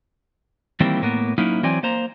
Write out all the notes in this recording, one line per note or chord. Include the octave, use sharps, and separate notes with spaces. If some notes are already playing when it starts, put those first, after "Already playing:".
D#3 E3 G3 A#3 C4
A2 A#3 B3
F#3 A#3 C#4 D#4 E4
E3 F#3 C4 D5 G#5
A#3 C5 A#5